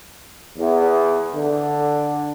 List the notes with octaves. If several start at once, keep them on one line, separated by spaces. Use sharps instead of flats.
E2
D3